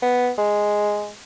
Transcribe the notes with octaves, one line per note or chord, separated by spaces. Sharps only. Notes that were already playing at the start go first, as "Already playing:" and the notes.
B3
G#3